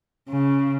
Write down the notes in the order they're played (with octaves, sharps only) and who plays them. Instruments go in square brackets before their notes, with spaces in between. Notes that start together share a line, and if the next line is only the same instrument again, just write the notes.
[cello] C#3